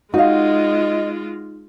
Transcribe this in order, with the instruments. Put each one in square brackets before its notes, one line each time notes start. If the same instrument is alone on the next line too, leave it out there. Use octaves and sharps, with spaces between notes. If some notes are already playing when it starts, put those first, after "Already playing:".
[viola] G#3 F4 [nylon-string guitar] D#4 [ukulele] F#4 F5 [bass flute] D#5